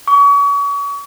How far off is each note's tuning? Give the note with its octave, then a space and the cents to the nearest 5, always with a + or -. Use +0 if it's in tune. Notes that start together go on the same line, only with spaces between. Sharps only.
C#6 +40